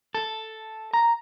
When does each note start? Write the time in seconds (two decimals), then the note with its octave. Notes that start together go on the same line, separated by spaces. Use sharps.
0.15 A4
0.94 A#5